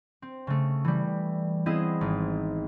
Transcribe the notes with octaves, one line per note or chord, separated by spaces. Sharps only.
C4
C#3 A3
E3 G3
B3 C4 E4 G#4 D#5
G#1